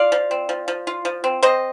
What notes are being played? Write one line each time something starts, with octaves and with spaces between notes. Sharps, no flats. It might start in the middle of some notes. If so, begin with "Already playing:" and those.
Already playing: F4 D5 F5
F3
C4
F3
F3
F4
F3
C4
C4 C5 D#5